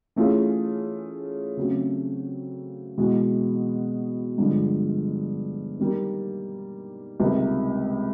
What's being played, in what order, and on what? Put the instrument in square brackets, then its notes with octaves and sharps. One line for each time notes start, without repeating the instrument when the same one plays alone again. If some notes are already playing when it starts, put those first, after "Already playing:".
[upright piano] E3 A3 C#4 F4 G#4
C#3 F#3 A3 C4
E2 B2 G#3
G2 D3 F3 G#3
D#3 G3 A#3
C#2 C3 D#3 G3 A#3